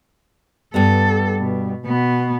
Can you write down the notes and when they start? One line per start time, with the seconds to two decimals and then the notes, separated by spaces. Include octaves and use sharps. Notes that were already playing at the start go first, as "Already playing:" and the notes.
0.74 G2 G3 B3 A4
1.40 B2
1.86 B2 B3